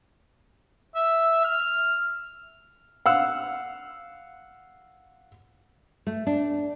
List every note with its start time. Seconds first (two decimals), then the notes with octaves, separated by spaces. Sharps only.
0.96 E5
1.45 F6
3.06 F5 F#5 E6
6.07 A3
6.27 D4